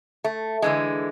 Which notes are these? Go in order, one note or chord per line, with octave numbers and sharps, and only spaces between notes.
A3
D3 E3 G#3